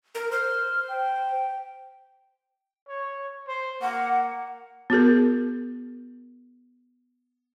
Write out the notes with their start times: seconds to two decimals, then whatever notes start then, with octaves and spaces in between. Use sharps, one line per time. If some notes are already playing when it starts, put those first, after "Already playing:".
0.15 A#4
0.32 C5 F6
0.89 G5
2.88 C#5
3.47 C5
3.81 A#3 F#5
4.90 B3 F#4 G#4 A#4